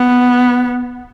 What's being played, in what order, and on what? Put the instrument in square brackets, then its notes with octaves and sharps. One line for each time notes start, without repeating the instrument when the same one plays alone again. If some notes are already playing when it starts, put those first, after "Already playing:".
Already playing: [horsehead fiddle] B3